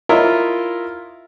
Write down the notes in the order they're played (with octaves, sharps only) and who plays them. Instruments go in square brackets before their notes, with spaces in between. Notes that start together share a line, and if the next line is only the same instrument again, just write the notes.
[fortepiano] E4 F4 A#4 C#5 D#5 E5